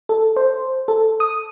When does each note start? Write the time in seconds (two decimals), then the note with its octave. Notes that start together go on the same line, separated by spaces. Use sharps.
0.09 A4
0.36 C5
0.88 A4
1.20 D#6